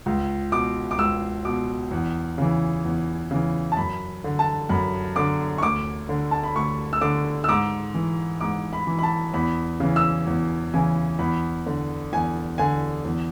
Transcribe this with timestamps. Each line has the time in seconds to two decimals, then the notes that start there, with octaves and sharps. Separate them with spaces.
0.06 C#2
0.52 B2 D6
0.91 D6
0.98 C#2 E6
1.45 B2 D6
1.91 E2
2.38 C#3 E3
2.85 E2
3.31 C#3 E3
3.72 A5
3.77 F#2 B5
4.24 D3
4.39 A5
4.69 F#2 B5
5.16 D3 D6
5.58 C#6
5.62 D2 D6
6.09 D3
6.31 A5
6.44 B5
6.56 D2 C#6
6.93 E6
7.01 D3 D6
7.44 E6
7.49 G#2 D6
7.94 E3
8.41 G#2 D6
8.73 B5
8.87 E3
8.99 B5
9.03 A5
9.34 E2 B5
9.80 C#3 E3
9.96 E6
10.27 E2
10.74 C#3 E3 G#5
11.19 E2 B5
11.66 D3
12.13 E2 G#5
12.58 D3 G#5
13.05 E2